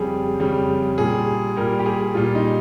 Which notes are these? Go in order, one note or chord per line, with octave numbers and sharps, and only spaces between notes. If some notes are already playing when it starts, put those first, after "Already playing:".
Already playing: F2 C#3 G3 G#4
F2 C#3 G3
A#2 G3 G#4
A#2 G3 A#4
G4
G#4
A#2 G3 F4
D#4